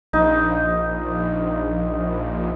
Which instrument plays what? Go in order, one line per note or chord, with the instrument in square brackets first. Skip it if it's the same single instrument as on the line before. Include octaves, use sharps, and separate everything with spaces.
[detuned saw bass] A#1 [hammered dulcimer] D#4